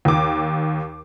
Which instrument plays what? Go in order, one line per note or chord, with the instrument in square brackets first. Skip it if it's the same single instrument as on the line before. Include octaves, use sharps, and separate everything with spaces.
[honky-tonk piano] D#2 D6